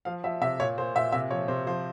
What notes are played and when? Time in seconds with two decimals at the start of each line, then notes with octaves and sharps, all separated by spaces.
0.05 F3 F5
0.24 F3 E5
0.41 C3 E5
0.59 A#2 C#5
0.78 A#2 C5
0.95 A#2 E5
1.12 C3 E5
1.31 F3 C#5
1.48 C3 C5
1.67 F3 C5